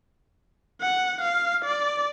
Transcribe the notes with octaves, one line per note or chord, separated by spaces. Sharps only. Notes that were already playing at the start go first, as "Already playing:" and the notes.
F#5
F5
D5